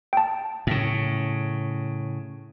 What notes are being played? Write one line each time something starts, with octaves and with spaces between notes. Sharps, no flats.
G5 A5
A2 C#3